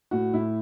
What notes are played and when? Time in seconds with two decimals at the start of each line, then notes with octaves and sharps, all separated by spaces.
0.11 A2 F#4
0.33 A2 E4